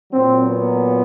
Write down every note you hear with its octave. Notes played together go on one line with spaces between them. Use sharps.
A#2 F#3 C4
B3